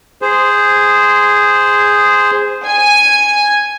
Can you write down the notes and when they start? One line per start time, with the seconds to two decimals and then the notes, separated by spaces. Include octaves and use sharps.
0.22 G#4 C5
2.64 G#5